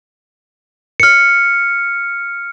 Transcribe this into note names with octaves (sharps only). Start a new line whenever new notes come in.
F6 C#7